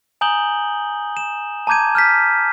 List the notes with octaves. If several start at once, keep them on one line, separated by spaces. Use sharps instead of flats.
G#5 A#5 D#6 G6 F#7 G7
E7
A5 A#5 D6 G6 G#6 D#7
F6 G6 B6